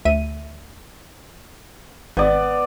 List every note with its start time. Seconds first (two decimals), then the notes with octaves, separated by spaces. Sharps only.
0.05 D2 E5 D#7
2.17 G#1 B3 D5